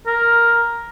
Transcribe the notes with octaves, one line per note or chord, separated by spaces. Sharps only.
A#4